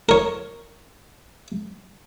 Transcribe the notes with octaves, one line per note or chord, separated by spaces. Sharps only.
A#4 C#5